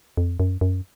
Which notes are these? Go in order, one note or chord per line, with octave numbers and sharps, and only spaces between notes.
F2
F#2
F#2